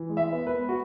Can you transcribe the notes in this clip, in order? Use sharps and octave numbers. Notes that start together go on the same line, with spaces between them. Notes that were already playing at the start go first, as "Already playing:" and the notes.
Already playing: E3
G#3
E5
B3
B4
B3
F#4